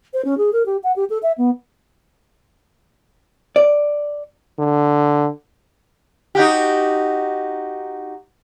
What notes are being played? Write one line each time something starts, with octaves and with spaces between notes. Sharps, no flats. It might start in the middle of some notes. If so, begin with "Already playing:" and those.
C5
C#4
G#4
A#4
G4
F#5
G4
A4
E5
B3
D5
D3
D#4 F#4 G4